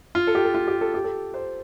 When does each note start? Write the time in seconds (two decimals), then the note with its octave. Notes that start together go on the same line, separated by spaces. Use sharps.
0.15 F4
0.27 A4
0.35 G4
0.45 A4
0.54 F4
0.68 G4
0.81 A4
0.94 G4
1.04 A4
1.34 C5